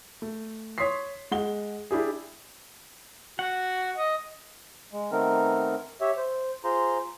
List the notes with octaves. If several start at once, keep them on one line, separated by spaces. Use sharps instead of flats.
A3
C#5 C6 D#6 B6 C7
G#3 F#5 G7
D4 E4 G4 G#4
F#4 F#5
D#5
G#3
D#3 A3 B3 C4 D#4 A#4
G4 C#5 E5
C5
F4 G#4 C5 A#5 C6